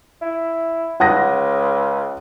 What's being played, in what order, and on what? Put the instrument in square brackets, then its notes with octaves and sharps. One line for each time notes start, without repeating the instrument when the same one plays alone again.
[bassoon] E4
[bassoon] C#2 [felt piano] F#5 D#6 A#6